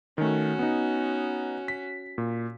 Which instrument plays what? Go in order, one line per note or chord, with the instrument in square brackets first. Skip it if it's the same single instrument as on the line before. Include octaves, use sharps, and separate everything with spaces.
[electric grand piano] D#3 A3 [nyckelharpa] C#4 F#4
[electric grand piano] B3 D#4
B6
A#2